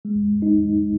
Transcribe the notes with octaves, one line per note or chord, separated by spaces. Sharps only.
G#3
D#4